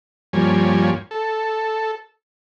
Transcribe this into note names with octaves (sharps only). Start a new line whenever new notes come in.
G2 F3 G3 A#3 C#5 G#5
A4